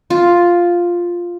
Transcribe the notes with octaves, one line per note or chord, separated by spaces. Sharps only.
F4